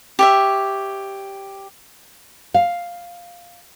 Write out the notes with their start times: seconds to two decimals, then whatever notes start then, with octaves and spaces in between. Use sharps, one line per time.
0.19 G4 C#5 E5
2.54 F5